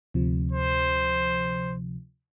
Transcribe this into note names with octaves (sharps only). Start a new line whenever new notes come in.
D2 C3 F3
C5